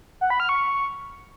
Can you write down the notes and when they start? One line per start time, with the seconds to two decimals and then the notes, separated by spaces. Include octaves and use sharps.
0.21 F#5
0.30 B5
0.40 F6
0.49 C#6